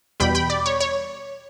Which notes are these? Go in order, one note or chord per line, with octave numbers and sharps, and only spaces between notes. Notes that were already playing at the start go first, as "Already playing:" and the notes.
E2 B2 G3 G5 B5
G5 B5
D5
C#5
C#5